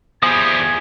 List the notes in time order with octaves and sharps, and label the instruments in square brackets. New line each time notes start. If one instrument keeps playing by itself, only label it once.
[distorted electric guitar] F3 G3 [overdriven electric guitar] E4 G#4 [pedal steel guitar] D#6 [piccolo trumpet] G#6